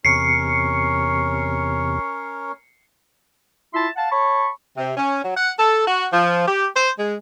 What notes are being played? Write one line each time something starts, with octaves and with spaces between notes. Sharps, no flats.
E2 C3 C#4 A#4 C#5 C7 C#7
E4 F4 E5 A5 C6
F5 F#5 A5
C#5 A5 B5 C#6
C3
C#4
F#3
F#5
A4
F#4
F3
G4
C5
G#3